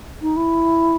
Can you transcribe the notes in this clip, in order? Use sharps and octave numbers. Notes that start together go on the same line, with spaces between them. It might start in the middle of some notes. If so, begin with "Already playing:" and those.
D#4
E4